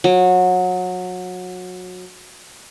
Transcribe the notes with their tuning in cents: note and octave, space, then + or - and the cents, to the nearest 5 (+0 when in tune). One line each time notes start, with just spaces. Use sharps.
F#3 -25